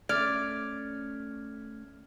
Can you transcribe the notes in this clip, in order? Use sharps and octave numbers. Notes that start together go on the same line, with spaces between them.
A3 C#4 D5 F6 G#6